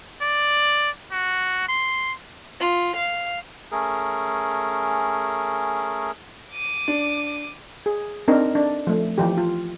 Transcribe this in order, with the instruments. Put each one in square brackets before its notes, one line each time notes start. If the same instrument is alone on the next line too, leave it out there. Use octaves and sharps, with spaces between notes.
[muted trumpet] D5
F#4
C6
[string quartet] F4
F5
[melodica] A3 C#4 G#4 A#4
[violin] D6 D#7
[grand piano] D4
[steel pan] G#4
C4 D4 D#4 A#4
D4
F3 A3
E3 F3 G4
F4